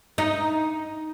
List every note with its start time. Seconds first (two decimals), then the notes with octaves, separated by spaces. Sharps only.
0.18 D#4